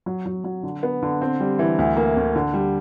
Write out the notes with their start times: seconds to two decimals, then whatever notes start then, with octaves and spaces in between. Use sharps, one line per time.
0.06 F#3
0.26 F#3
0.44 F#3
0.63 D3
0.83 B3
1.03 D3
1.21 C4
1.40 G3
1.59 E3
1.79 D2
1.97 A#3
2.17 D2
2.36 D3
2.54 G3